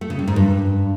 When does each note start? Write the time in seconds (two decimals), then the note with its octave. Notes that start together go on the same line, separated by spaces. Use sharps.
0.01 A3
0.10 C#3
0.19 G3
0.27 G#2
0.36 G2